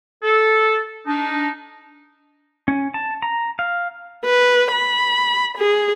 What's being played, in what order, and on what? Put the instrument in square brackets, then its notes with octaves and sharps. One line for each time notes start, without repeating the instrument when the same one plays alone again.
[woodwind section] A4
D4 D#4
[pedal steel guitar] C#4
A5
A#5
F5
[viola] B4
B5
G#4